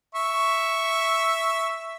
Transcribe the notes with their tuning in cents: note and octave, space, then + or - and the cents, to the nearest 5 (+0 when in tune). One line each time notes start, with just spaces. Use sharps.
E5 +0 C#6 +0